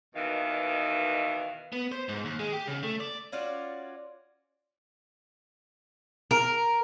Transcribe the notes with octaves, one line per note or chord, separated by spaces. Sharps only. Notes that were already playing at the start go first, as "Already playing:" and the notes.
D#2 B2 D#3 E3 F5
B3
C5
G#2
D#2
G#3
G4
C#3
A3
D5
C#4 F4 F#4 D5
A#4